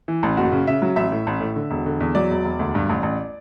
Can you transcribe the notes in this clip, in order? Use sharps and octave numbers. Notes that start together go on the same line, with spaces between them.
E3
A1
F#1 F#4
C#3
C#3 E5
F#3
A1 E5
A2
A1
A2
D3
E1
D3
E2
F#3 D5
E1
E1
D2
G2
A1
A1